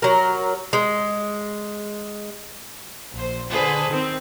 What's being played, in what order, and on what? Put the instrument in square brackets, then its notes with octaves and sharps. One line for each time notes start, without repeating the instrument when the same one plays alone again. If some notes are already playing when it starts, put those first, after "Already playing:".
[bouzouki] F#3 A#4
G#3
[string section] A#1 C5
D3 G#4 A4 B4 C5
D#3 C4